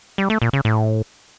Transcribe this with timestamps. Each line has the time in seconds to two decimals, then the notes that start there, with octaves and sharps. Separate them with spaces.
0.18 G3
0.30 A3
0.42 A#2
0.53 C#3
0.65 A2